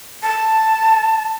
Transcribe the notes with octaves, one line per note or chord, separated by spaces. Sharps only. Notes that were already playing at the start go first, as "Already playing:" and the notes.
A5